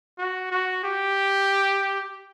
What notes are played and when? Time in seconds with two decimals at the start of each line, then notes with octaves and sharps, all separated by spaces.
0.18 F#4
0.51 F#4
0.84 G4